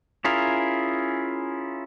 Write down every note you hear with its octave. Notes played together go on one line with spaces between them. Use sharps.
C#4 E4 F4 G#4 A#4